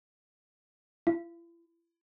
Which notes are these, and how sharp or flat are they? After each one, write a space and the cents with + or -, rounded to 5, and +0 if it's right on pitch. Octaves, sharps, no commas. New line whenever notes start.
E4 +40